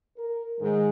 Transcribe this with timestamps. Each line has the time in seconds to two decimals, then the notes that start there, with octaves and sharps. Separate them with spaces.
0.16 A#4
0.60 G#2 D#3 G#3